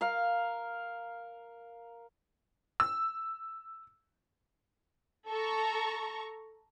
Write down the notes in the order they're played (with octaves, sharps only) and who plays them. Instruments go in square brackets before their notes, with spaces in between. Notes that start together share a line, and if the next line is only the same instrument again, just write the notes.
[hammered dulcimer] A#4 F5
[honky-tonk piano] E6
[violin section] A4 A#5 C#6